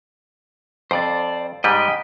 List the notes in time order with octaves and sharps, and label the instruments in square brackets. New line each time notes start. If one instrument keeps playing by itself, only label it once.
[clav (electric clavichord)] F2 [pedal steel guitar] C5 D5 A5
[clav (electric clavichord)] G#2 G3 G#3 [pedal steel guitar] D#5 G5 B5